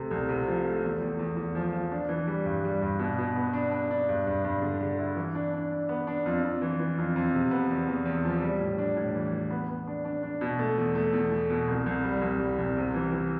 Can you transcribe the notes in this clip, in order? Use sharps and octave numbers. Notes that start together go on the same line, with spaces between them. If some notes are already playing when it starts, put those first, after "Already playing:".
Already playing: C3 A3
C2
C3
F3
A3
E2
E2
E2
E2
F3
F3
D4
E3
G3
G2
G3
G2
B2
B2
B3
D4
D4
D4
G2
G2
G2
D3
D3
E4
E3
D4
D4
D4
B3
D4
F2
F2
E3
E3
F2
F2
C3
B3
E2
E2
E2
F3
G3
A2
D4
A2
E3
E3
B3
B3
D4
D4
D4
B2
A3
E2
A3
E2
A3
B2
C2
C2
G3
C2
G3
C2
C3
E3
E3